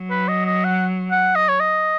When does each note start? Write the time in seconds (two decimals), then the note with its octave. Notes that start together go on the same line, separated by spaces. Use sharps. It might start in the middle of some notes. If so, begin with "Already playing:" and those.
Already playing: F#3
0.10 B4
0.28 D#5
0.46 D#5
0.64 F#5
1.11 F#5
1.35 D#5
1.48 C#5
1.60 D#5